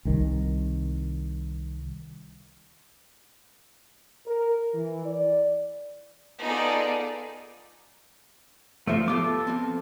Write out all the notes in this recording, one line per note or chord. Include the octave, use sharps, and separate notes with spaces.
C2 D#3
A#4
E3
D5
B3 D#4 F4 G#4 A4 D5
F3 A3 A#3 C5 E5
B3 F4 G4 A4 D6
F3 B3 C4